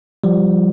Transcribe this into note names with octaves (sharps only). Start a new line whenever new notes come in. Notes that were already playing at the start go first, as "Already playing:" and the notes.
F3 G3